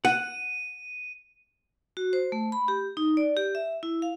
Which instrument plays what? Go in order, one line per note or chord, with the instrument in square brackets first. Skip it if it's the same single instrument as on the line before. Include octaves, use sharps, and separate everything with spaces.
[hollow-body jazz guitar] F#5 [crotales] D#7
[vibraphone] F#4
C5
A3
B5
G4
D#4
D5
G4
E5
E4
F5